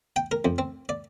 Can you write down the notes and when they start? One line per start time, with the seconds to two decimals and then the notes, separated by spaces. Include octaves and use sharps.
0.16 G5
0.31 A#4
0.45 F2
0.58 C4
0.89 D5